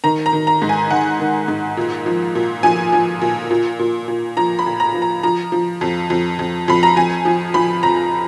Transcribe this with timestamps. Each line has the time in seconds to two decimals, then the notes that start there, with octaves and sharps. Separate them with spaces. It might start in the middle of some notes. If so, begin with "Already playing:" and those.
0.04 D#3 A#5
0.26 A#5
0.33 D#3
0.47 A#5
0.62 G#2
0.69 G#5
0.90 D#3 F#5
1.20 D#3
1.48 G#2
1.77 A#2
2.06 F3
2.35 A#2
2.63 F3 G#5
2.92 F3
3.21 A#2
3.51 A#2
3.79 A#2
4.08 A#2
4.37 F3 A#5
4.59 B5
4.66 A#2
4.80 A#5
4.94 F3
5.02 A#5
5.23 F3 A#5
5.52 F3
5.81 F2
6.10 F2
6.39 F2
6.68 F2 B5
6.83 A#5
6.96 F2 G#5
7.25 F3
7.54 F3 B5
7.83 F2 A#5